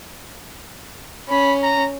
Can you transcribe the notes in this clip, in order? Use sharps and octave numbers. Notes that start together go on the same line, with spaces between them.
C#4 B5
A#5